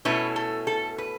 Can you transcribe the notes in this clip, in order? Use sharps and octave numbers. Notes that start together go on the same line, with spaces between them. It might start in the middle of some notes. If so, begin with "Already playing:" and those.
B2 A3 C#4 E4 B4
A4
A4
B4